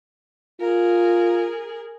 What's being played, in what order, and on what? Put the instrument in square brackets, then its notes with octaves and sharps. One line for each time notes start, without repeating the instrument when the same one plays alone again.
[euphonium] F4 [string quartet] G#4 A#4